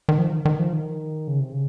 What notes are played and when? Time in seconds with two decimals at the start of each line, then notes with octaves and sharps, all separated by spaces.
0.09 D#3
0.18 F3
0.32 D#3
0.45 D#3
0.59 F3
0.73 D#3
1.28 C#3
1.40 C3
1.52 C#3